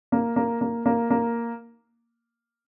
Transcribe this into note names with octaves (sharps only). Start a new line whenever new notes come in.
A#3
A#3
A#3
A#3
A#3